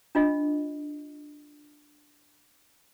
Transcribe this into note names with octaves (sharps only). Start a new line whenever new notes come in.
D4 F4 D#5